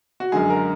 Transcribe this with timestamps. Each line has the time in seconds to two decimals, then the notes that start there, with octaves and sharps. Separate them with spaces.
0.20 F#4
0.32 F#2 D3 G#3 G#4
0.50 A#4